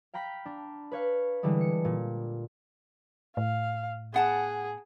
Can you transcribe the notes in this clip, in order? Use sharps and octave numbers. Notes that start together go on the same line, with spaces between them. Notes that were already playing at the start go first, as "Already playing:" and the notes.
F5 G5 A#5 B5 G6 B6
D4
B4 C#5 F5
D3 E3 G3 G#3
C#7
A#2
A2 F5
B3 G#4 F#5 A5